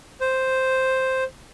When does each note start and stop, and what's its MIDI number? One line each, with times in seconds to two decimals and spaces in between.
0.21 1.24 72